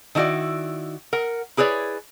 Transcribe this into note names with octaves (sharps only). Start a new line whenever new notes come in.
D#3 D4 E4 F#4 D5
A#4 F#5
E4 G#4 B4 C#5 D5